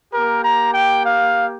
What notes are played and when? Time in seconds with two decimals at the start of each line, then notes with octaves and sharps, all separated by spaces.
0.13 A#3 G4 A#4
0.44 A#5
0.73 G5
1.05 F5